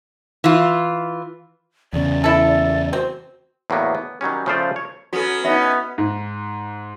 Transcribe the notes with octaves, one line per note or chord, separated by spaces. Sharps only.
E3 F4
E2 C#3 D5
E4 A4
C4 F#4
E2 A2 F#3 A#3 B3
B3
D#3 F#3 G3 C#4
C#3 F3 A3 F4 C5 D5
C#5
F#3 B3 C#4 F#4 A4
B3 C#4 D#4 E5
G#2